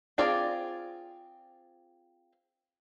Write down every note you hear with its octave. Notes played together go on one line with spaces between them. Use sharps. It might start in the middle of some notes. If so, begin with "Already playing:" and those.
C4 F4 G#4 D5